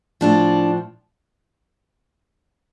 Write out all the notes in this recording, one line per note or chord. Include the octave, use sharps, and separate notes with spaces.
A2 F3 D4